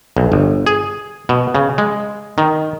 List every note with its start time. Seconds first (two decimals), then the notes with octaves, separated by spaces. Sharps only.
0.17 B1
0.32 G1
0.67 G#4
1.29 B2
1.55 C#3
1.78 G#3
2.38 D#3